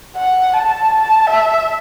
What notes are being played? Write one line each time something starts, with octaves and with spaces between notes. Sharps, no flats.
F#5
A5
A5
E5